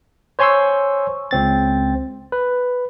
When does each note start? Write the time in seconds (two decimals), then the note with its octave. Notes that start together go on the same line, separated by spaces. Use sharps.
0.39 C5 C#5 G#5 C6 C#6 E6
1.31 C#2 C4 A6
2.32 B4